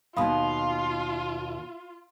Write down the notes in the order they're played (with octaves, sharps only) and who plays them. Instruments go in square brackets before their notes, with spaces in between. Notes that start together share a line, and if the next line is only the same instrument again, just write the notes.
[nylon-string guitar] D#2 B2 [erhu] F4 [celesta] F5 B5 D#6